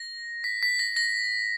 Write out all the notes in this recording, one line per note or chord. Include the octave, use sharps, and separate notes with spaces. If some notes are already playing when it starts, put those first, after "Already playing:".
Already playing: A#6
B6
B6
A#6
A#6